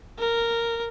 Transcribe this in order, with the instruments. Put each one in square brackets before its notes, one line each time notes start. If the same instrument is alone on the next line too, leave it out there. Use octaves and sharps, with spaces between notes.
[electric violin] A#4